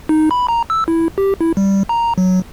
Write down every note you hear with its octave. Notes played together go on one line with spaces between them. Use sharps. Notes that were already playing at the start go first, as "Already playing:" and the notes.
D#4
B5
A#5
E6
E4
G4
E4
G3
A#5
F#3